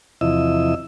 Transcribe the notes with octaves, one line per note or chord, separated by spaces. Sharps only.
E2 C3 F3 E4 D#5 E6